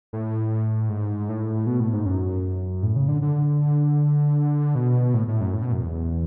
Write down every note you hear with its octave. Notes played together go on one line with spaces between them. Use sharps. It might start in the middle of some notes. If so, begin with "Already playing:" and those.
A2
G#2
A2
B2
A2
G#2
F#2
A2
C#3
D3
D3
B2
A2
A2
F#2
A2
B2
F#2
E2